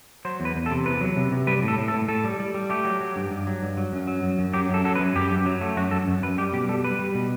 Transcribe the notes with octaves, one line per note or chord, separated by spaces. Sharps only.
F#3 C5
E2
B4
E2
A4
C3
E2 B4
F#3
C3
C3
G3 B4
A2
A4
A2
A4
A2
A2 A4
G3
G3
G3
A3 G4
F#3
F#3
G2
G2
F#3
G2
F#3
F#2
F#3
F#2
F#2
F#3 G4
F#2 A4
F#3 A4
B4
F#2
F#2 G4
F#2
F#3
A3
F#2 F#4
F#2 A4
F#2
F#2 B4
G3 G4
B2 G4
G3 A4
G3 B4
G3
B2